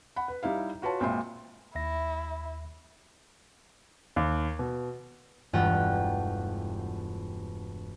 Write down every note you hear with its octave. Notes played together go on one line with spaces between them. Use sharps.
F#5 B5
B4
G3 D#4 E4 F5
F4 F#4 B4 C#5 A5
G#1 A#2 E5 G5 C6
D#2 E4 E5 A#6
D#2
B2
E1 G2 A3 F4 F#5 G5